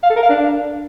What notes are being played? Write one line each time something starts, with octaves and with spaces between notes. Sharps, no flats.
F5
A4
A#4
F5
D4